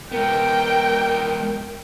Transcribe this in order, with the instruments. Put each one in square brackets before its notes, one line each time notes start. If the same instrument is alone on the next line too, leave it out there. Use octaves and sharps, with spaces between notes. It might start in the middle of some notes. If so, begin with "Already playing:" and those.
[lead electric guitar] G#3 B3 [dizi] A#4 [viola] G5